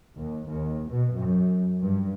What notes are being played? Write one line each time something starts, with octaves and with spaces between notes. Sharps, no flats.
D#2
D#2
B2
F#2
G2